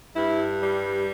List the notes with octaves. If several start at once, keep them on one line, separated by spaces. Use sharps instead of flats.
G2 E4
G3